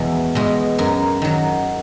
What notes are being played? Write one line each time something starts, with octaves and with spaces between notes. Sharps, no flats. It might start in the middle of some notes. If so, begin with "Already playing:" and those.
Already playing: E2 B2 G#3
B2 G#3
F#2 A#4
D#3 F#3